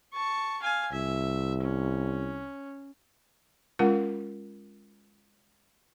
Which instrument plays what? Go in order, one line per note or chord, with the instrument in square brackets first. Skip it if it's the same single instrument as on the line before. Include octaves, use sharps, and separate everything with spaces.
[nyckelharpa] A5 C#6
F5 G#5
[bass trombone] C2 [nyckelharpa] E5
[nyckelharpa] C#4
[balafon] G#3 C#4 F4 A#4 F#5